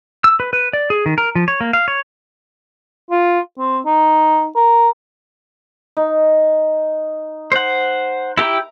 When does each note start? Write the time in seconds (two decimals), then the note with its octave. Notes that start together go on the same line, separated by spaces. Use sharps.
0.24 E6
0.40 B4
0.53 B4
0.73 D5
0.90 G#4
1.06 D#3
1.18 A#4
1.35 F3
1.48 C#5
1.61 A#3
1.73 F5
1.88 C#5
3.11 F4
3.59 C4
3.86 D#4
4.56 A#4
5.97 D#4
7.52 C5 F#5
8.37 E4 G4 E5 G5 A#5 D6